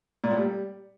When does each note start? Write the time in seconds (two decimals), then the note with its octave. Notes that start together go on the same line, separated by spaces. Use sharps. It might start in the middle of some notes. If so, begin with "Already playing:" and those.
0.24 A#2
0.31 A2
0.38 G3